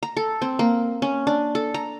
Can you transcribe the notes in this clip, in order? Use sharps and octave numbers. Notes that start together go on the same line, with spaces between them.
A#5
A4
C4
A#3
C#4
D4
A4
A#5